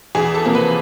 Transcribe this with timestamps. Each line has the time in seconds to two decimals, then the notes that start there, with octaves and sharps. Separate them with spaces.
0.15 E2 G#4
0.34 A4
0.45 C3 F3 A#3
0.55 B4